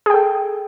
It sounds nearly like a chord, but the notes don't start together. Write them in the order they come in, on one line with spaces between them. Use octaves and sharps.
G#4 G5 A4